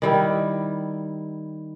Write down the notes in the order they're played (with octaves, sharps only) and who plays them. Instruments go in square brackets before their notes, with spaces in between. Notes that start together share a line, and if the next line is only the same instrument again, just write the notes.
[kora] D#3 G3 E4